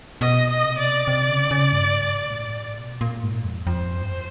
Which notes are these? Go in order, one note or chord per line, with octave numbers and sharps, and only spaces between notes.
B2 D#5
D#5
C3
D5
C3
C#3
C#3
G2
G#2
G2
G#2
A#2
A2
B2
A#2
G#2
F2
F2 C5
G2